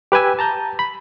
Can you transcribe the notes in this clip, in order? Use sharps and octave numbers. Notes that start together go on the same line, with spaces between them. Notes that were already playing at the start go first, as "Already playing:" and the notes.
G4 B4 G5 G#5 E6
A5 A#5 G6
B5